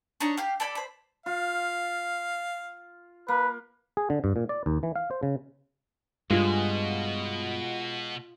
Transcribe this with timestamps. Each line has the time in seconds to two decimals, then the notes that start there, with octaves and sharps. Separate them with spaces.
0.20 D4 D#4 C#5 A#5
0.37 G4 F5
0.60 A4 D5 B5
0.75 C5 B5
1.26 F4 F5
3.28 A#3 B4
3.97 G#4
4.10 D3
4.24 G2
4.36 A#2
4.49 D5
4.66 D#2
4.83 E3
4.95 F5
5.11 C5
5.23 C#3
6.30 G2 B2 G#3 F4